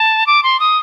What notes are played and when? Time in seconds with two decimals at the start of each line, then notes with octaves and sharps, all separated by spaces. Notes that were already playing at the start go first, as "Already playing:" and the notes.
Already playing: A5
0.27 D6
0.43 C6
0.60 D#6